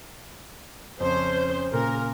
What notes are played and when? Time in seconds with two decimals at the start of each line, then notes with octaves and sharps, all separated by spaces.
1.00 F2 C#3 C#4 C5
1.73 A#2 C#3 A#4